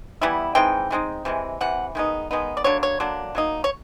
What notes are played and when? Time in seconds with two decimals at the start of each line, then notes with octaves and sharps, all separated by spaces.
0.21 E3 G3 B3 E4
0.55 E3 G#3 C4 D#4 G5
0.91 E3 G#3 C4 D#4
1.25 C3 E3 G#3
1.61 C3 E3 F#5
1.95 D#3 G#3 B3 D#4
2.31 D#3 G#3 B3 D#4
2.57 D5
2.64 D3 F#3 A#3 D4 C#5
2.83 C#5
3.00 D3 F#3 A#3 D4
3.35 F#3 A#3 D#4
3.64 C#5